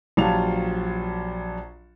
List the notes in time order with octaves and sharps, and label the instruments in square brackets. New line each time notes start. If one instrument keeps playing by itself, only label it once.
[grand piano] A#1 F#3 F4 G4 A5 F7